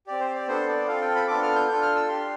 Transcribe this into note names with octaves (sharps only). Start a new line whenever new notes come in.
C4 G4 D5
C5
D5
B3 D4 A4 C5
D5
C4 F4 A4 F5
G5
B5
B3 D4 F4 A4 D6
F6
G6
D4 F4 A4 G6
F6
E6
D4 G4 C6